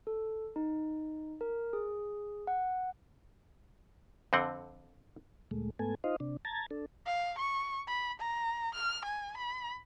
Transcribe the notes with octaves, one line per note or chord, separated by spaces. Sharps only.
A4
D#4
A#4
G#4
F#5
F2 D3 C4 F#5
D2 A#2 G#3 A3
G#2 A3 B3 A4 G#5
D#4 F4 C5 D#5 F5
C3 D4
A5 A#5 G#6 A6
D4 A4
F5
C#6
B5
A#5
F6
G#5
B5